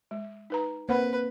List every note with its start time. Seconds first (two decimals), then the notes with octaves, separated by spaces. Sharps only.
0.11 G#3
0.50 D#4 B4 A#5
0.89 A#3 C4 B4 C5 F#5 B5